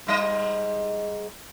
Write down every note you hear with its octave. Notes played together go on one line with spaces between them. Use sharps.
G#2 G3 D#5